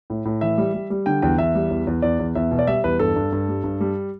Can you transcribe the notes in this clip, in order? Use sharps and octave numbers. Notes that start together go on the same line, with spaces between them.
A2
A2
E3 E5
G3
G3
G3
D3 G5
E2 G5
E2 E5
G3
E2
E2
E2 D5
E2
E2 E5
B2
D5
G3 E5
E2 B4
G2 A4
G2
G2
G3
G2
G3